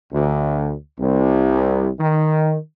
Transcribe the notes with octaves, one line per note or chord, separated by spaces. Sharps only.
D2
C2
D#3